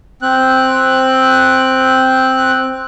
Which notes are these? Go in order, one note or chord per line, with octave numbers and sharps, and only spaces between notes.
C4 F#6